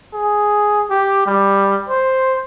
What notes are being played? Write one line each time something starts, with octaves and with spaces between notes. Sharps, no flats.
G#4
G4
G3
C5